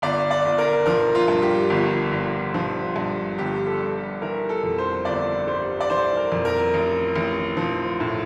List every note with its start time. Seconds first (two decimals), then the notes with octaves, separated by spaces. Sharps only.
0.02 G1 D5
0.31 D5
0.45 G1
0.58 A#4
0.86 F3 A#4
1.15 F4
1.28 G2
1.42 G4
1.70 G1
2.11 G1
2.54 F3
2.96 G2
3.38 G1 G4
3.66 A4
3.80 G3
4.22 E3 A#4
4.49 A4
4.63 F2
4.78 C5
5.05 G1 D5
5.47 G3 C5
5.80 D5
5.89 E3 C5
6.17 A#4
6.32 F2
6.45 A#4
6.74 A1
7.15 A1
7.57 F3
8.00 A2